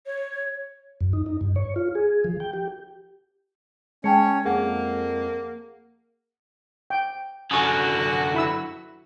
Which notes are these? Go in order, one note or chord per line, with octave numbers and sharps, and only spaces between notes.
C#5
F#2
D#4
D#4
G2
C#5
F4
G#4
F3
G5
G4
G#3 C#4 C#5 G5 A5 C#7
F2 A#3 G#4 F#5
G5
F#2 D3 F#4 G#5 C#6 D#6
E4 B5 E6